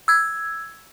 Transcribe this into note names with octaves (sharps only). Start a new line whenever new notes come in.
E6 G#6